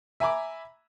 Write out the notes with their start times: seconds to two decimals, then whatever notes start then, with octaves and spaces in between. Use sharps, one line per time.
0.20 E5 G#5 A#5 B5 D6